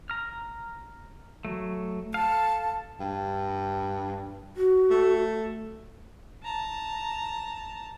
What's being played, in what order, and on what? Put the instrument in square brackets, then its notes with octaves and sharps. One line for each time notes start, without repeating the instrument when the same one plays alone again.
[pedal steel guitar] A#5 F6
F#3 A3
[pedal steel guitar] A4 F5 [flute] A5
[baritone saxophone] G2
[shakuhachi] F#4
[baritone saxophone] A3
[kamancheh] A5 A#5